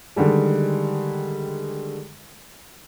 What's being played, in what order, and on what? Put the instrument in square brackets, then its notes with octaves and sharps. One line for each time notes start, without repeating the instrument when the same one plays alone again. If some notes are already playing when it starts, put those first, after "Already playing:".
[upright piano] D3 D#3 G3 G#3